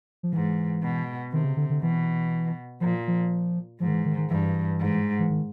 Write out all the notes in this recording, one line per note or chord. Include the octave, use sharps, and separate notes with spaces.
F3
G#2 E3
B2
C3 D#3
C#3
D3
D3
B2 E3
A#2 F3
F3
G#2 F3
D#3
E3
D#3
D#3
G2 E3
G#2
E3
D#3